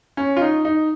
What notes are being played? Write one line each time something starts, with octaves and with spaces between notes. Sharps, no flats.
C#4
F4
D#4
D#4